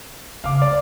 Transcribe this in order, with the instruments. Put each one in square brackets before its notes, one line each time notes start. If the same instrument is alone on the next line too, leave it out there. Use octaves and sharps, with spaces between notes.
[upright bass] C#3 [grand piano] F5 D6
[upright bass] G#3 [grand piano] D5